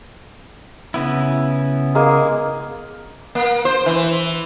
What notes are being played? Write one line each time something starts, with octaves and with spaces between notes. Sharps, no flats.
C#3 B3 E4
G#3 A#3 G#4
A#3
C5
E3